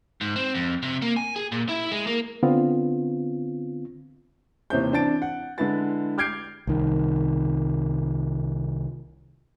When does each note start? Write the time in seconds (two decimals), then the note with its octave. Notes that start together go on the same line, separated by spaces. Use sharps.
0.21 G#2
0.36 C4
0.55 F2
0.83 C3
1.02 A#3
1.16 G#5
1.36 G#4
1.52 A#2
1.69 E4
1.92 G#3
2.07 A#3
2.43 D3 B3 C4 F4
4.70 D#2 C3 E3 C5 C#5 G6
4.91 E3 C4 D4 A5 A6 D7
5.22 F#5
5.58 D3 G#3 E4 B4 A6
6.18 D6 F6 G6 G#6 C7 D7
6.67 C2 D#3